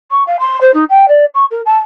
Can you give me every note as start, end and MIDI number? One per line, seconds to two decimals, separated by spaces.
0.11 0.23 85
0.27 0.36 77
0.40 0.60 84
0.61 0.71 72
0.74 0.84 63
0.90 1.06 79
1.08 1.25 74
1.34 1.45 85
1.51 1.61 70
1.66 1.77 81